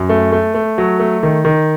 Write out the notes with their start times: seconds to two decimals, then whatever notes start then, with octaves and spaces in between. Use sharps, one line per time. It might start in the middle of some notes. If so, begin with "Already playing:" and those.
Already playing: F#2
0.09 A3
0.32 A3
0.54 A3
0.78 F#3
1.00 A3
1.23 D#3
1.45 D#3